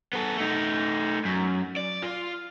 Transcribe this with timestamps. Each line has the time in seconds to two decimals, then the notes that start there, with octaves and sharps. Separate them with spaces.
0.13 B3 A4
0.37 A3 D#4
1.25 F#2
1.77 D5
2.02 F4